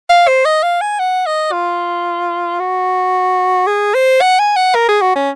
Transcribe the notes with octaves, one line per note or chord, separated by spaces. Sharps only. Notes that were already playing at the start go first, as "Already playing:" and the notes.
F5
C5
D#5
F5
G#5
F#5
D#5
F4
F#4
G#4
C5
F#5
G#5
F#5
A#4
G#4
F#4
C#4